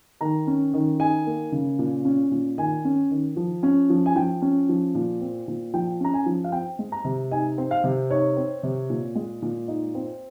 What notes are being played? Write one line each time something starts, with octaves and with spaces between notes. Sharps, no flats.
D#3 A#5
C#4
D#3
D#4 G#5
A#3
C#3
A#2
C#4
A#2
D#3 G#5
C#4
D#3
F3
C#4
F3
G#5
F3 G5
C#4
F3
A#2
C4
A#2
F3 G5
C#4 A#5
G#5
F3
F5
C4 G5
G#3
A#5
C3
D#4 G#5
C4
F5
C3
D#4 C#5
C4
C3
A#2
G#3
A#2
D#4
C4